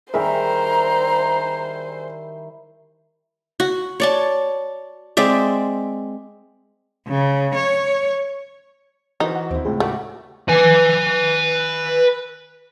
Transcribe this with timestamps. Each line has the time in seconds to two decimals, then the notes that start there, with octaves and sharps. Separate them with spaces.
0.14 D#3 G3 E4 G#4 A#4 C5 E5 A#5
3.60 F#4
4.00 C#5 D5 A5
5.17 G#3 C4 D5 E5
7.08 C#3
7.55 C#5
9.20 E3 D#4 F#4 C5
9.36 F#5
9.51 D#2 C4 E4
9.65 C#2 A2 G#4
9.80 A3 F#4 G4 F#5
10.49 B4 G#5